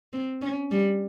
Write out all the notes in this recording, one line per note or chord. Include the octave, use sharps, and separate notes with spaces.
C4
C#4
G3